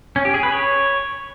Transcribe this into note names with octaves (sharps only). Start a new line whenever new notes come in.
C#4
G4
G#4
B4
C#5